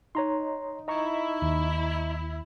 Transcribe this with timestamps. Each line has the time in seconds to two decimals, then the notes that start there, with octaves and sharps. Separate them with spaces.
0.15 D#4 C#5 A#5 C6
0.88 E4 D#5 A#5 C#6
1.42 D#2